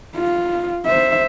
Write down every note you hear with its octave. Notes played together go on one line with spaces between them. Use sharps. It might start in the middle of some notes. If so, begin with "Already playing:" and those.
F4
C5 E5